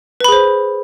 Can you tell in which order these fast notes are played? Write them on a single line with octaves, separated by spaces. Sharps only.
B4 B5 G#4 C5